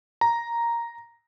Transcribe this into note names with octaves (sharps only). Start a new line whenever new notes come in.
A#5